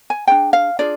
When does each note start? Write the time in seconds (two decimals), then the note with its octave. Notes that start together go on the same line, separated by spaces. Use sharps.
0.10 G#5
0.28 D4 F4 G#4 G5
0.53 F5
0.79 D4 F4 G#4 D5